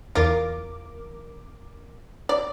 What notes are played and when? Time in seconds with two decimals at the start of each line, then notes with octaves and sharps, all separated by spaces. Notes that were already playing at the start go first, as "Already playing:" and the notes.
0.15 E2 F4 A#4 D6
2.29 D5